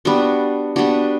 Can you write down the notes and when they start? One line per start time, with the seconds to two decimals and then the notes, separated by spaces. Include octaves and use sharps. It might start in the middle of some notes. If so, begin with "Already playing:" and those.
0.05 G3 B3 D4 F#4
0.76 G3 B3 D4 F#4